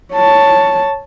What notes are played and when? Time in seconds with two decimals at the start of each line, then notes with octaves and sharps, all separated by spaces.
0.13 C#5 A5